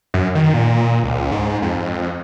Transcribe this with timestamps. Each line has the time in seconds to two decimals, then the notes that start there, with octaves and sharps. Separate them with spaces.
0.14 F#2
0.35 D#3
0.53 A#2
1.04 C#2
1.32 G#2
1.62 F2